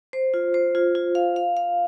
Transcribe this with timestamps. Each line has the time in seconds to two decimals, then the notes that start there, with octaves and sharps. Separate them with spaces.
0.13 C5
0.34 F4
0.54 C5
0.75 F4
0.95 F4
1.15 F5
1.36 F5
1.57 F5